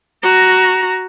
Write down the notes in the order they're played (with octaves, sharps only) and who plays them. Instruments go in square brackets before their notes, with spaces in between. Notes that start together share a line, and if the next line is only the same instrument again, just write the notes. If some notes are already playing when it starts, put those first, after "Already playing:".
[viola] F#4 A#5